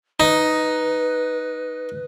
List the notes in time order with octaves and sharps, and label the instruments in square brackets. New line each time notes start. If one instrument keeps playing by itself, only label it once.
[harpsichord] D#4 [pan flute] B4